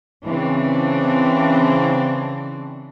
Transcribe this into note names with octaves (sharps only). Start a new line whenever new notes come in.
C#3 E3 C4 D4